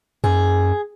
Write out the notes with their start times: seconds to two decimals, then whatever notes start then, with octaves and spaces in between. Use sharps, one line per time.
0.24 F#2 G#4